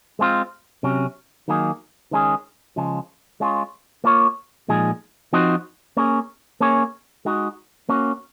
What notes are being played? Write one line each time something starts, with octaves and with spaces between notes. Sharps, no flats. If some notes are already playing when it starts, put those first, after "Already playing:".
G#3 C4 F4
C3 F#3 C#4
D#3 F#3 A#3 D#4 G#4
D#3 G#3 C#4 G#4
C#3 F3 G#3
G#3 C#4 F4
A#3 F4 A#4 C#5
A#2 F3 G#3 D#4 G#4
F3 C4 D#4 F#4 C5
A#3 C#4 G#4
A#3 C#4 G#4 C#5
G#3 D#4 F#4
A#3 C#4 F#4